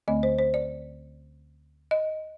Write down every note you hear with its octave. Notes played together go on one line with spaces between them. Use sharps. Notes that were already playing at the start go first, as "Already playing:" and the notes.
D2 D3 A3 C4 D#5
C5
C5
D5
D#5